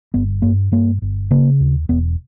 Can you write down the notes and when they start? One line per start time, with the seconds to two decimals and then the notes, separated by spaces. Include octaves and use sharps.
0.14 G1 B3
0.42 G2 A#3
0.72 G2 A#3
1.02 G1
1.31 C#3 A#3
1.60 D#2
1.89 E1 B3